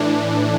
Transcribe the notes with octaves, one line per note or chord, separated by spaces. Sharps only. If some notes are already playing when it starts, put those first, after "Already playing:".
Already playing: A2 E3 D4